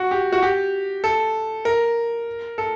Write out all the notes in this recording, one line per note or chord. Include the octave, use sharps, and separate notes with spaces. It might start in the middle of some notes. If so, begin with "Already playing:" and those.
Already playing: F#4
G4
F#4
G4
A4
A#4
A4